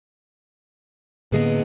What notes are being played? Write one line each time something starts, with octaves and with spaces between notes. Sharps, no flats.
A2 D3 A#3 B3 G#4 D#5